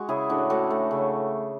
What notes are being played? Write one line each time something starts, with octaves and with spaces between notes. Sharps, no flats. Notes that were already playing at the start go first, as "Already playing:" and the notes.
Already playing: G#3 F#4 F#5
C#3 E4 G#4
A2 D4 F#4
A2 F#4 A4
A3
C#3